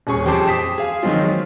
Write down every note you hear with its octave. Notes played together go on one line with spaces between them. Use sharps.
D#1 C#4 G#4 C#6
F2 G4 G#4 C5 A5 D6
D#6 B6 E7
G#4 F5 G#5
D#3 F3 F#3 G#3 C4 F4